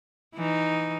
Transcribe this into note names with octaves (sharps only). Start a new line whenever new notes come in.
E3 D#4